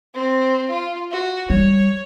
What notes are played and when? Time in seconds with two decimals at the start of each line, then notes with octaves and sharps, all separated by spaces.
0.15 C4
0.70 F4
1.11 F#4
1.50 G3 C#5